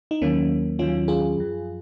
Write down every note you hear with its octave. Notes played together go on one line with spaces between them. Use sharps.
D#4
D#2 D#3 F#3 A#3 C#4
D#2 D#3 F#3 C#4 F4
F4 G#4
F#2 F3